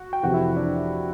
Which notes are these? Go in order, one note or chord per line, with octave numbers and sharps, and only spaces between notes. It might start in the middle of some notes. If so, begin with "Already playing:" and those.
Already playing: F#4
G5
F2 C3 E3 F#4 F#5
E4 E5
D4 D5